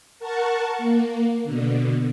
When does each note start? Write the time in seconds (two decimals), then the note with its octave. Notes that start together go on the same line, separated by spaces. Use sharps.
0.19 A#4 F#5 A5 C#6
0.78 A#3
1.44 B2 D3